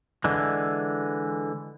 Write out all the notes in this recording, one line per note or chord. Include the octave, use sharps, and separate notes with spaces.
D3 E3 G#3